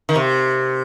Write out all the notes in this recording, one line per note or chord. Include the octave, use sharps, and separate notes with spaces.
D#3
C3